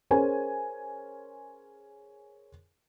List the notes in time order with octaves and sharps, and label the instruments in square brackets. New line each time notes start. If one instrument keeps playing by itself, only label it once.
[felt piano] C#4 G#4 A#4 C5 G#5